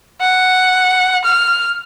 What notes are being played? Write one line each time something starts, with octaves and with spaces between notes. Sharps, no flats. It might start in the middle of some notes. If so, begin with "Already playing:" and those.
F#5
F6